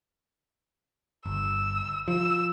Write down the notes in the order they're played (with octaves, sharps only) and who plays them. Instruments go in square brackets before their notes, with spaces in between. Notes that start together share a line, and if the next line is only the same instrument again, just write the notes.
[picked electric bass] G1 [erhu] E6
[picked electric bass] F3 [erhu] E6